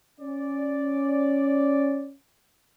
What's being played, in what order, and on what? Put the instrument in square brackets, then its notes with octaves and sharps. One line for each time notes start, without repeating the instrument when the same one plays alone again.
[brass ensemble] C#4 D5